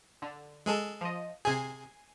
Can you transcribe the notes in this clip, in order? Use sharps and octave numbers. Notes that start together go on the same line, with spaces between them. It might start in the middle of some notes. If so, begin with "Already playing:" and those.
D3
G#3 G#4 A4
F3 D#5
C3 G#4 G#5 C7